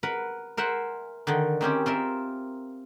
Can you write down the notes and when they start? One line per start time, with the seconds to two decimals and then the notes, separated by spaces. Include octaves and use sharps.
0.03 A#4 B4 F#5 B5
0.57 A#4 C5 E5 F#5 G#5
1.27 D3 D#3
1.61 D#3 C4 C#4 G4
1.86 C4 F4 A#4 E5